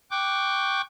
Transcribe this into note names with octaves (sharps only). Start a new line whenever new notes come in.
G5 C#6 D6 F#6 G6